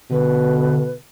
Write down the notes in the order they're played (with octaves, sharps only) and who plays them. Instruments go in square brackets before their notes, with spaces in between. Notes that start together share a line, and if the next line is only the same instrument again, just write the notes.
[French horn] B2 [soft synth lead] D3 [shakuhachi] B4